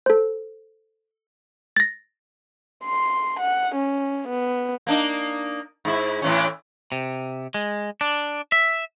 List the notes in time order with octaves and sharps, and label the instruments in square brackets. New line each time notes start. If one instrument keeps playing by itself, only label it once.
[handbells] A4 C5
A6 A#6
[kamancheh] C6
F#5
C#4
B3
[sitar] A#3 D4 D#4
G#2 E4
A2 E3 C#4
[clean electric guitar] C3
G#3
D4
E5